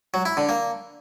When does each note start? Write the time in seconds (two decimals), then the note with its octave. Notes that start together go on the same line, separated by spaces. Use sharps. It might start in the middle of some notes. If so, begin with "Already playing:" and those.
0.14 F#3
0.25 E4
0.37 D3
0.49 A#3